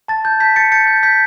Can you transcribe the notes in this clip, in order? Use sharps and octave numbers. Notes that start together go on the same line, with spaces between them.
A5 A6
A5 G6
A5 G6 B6
A5 A6 C#7
G6 A6 C#7
G6
G6 B6